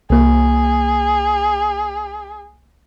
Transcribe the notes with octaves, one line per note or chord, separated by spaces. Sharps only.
C2 A#3 G#4